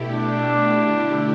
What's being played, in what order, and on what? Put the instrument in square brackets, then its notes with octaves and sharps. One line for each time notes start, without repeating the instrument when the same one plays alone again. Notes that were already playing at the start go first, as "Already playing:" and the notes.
Already playing: [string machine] B2 A3 E4 G4
[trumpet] D4
[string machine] D3 A3 E4 G4